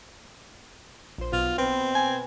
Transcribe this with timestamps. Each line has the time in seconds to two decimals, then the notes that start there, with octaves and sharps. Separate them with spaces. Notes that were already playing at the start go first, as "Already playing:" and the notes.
1.18 A#1 C5
1.32 B1 B2 F4
1.58 B2 C4 B4
1.95 G#5